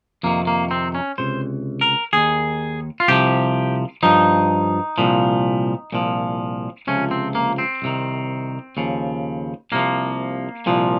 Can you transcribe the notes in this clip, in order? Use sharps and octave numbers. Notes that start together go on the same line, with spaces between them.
F2 C3 D#3 A#3
A#3
C4
C#4
C#2 C3 C5
A#4
D#2 D#3 G#4
F4
C2 C3 F3 G4
G2 F3 D#4
C2 A#2 F3
C2 A#2 F3
C#2 C3 F3 C#4
C4
A#3
C4
C2 C3 D#3
D#2 C#3 F3
C2 C3 F3 A#3
C2 A#2 F3